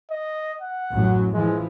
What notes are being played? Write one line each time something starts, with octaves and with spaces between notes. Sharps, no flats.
D#5
F#5
A1 F#2 F#3
E3 F3 G#3